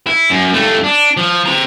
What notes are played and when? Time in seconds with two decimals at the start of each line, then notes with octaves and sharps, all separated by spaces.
0.07 E4
0.30 F#2
0.53 G2 A3
0.84 D4
1.17 F3
1.46 C4 A#5